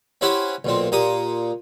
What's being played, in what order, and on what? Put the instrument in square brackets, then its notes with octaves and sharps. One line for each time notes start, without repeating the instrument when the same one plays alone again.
[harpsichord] C4 C#4 E4 G4 F#5 B5
B1 A#2 C4
A#2 G4 A#5 D#6